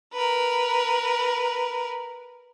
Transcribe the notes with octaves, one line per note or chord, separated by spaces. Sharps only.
A#4 B4